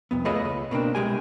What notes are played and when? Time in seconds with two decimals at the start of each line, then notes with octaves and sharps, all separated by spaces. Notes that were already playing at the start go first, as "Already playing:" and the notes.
0.11 C2 F2 B3
0.25 A3 F4 G#4 B4 C#5 D#5
0.45 C#2
0.71 B2 A#3 C4 D4
0.95 C2 G#3 G4 G#5